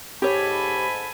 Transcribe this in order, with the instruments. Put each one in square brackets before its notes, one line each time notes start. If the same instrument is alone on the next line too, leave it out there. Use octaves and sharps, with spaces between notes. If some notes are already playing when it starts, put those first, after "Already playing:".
[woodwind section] G#2 B5 [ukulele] G4 C#5 [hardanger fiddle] A4 G#5